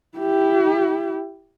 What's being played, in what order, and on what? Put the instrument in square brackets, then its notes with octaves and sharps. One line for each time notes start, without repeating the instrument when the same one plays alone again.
[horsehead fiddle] E4 G4